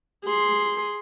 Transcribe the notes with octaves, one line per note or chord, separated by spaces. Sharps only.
G#4 C6